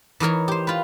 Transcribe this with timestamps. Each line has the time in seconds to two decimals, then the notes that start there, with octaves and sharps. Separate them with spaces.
0.20 E3 D#4 A#4 C#5
0.48 G4 C5
0.67 F4 B4